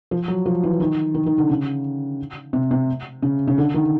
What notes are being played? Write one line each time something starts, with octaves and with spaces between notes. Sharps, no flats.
F3
F#3
F3
E3
D#3
D#3
D#3
D3
C#3
C3
C3
C#3
C#3
D3
D#3